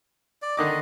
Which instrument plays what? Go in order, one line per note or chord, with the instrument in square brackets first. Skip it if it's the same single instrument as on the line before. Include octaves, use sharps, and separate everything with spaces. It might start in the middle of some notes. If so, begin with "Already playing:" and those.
[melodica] D5
[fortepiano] D3 D#3 D6 [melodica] D#5